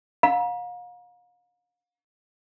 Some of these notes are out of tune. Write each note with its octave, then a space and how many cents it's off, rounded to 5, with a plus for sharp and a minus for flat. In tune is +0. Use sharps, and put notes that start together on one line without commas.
F5 +40 A#5 +35